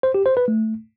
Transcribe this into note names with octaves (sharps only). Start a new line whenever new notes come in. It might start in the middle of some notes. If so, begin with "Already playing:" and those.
C5
G4
C5
B4
A3